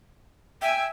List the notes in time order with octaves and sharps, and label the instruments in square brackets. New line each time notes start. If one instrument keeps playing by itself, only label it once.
[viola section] E5 G#5 [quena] G5